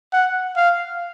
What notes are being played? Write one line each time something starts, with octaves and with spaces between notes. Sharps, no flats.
F#5
F5